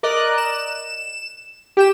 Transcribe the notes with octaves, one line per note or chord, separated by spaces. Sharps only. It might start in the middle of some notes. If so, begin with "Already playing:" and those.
A#4 D5 D#5 F#6
E7
G4 G5 E7